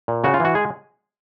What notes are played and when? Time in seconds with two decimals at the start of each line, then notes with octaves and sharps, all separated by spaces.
0.08 A#2
0.24 C#3 F#4
0.34 F4
0.40 E3 F#4
0.55 G#3 G#4